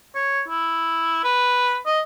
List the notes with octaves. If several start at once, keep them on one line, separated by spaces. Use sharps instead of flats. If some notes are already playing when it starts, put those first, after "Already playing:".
C#5
E4
B4
D#5